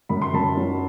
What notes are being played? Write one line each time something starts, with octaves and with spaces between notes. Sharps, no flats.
F#2 B5
C6
F#2 A5 B5
F#3